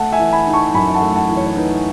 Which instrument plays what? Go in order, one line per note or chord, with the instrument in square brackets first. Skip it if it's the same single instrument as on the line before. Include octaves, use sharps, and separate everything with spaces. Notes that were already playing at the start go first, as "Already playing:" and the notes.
Already playing: [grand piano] A3 F#5 A5
E5 G#5
E3
G#5 B5
D#4
A5 C#6
F#2 G#5 B5
F#5 A5
A3
F#5 A5
E3
C#5
C#5
D#4 B4